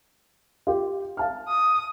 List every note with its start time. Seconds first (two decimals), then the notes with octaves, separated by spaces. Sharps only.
0.67 F4 G4
1.17 F5 A5 F6
1.48 D#6